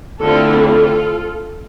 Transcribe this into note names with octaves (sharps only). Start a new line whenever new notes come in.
D3 A3 C4 E4 F4 A4
F4 A4